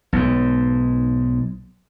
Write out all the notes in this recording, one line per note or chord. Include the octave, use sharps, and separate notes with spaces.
B1 G#2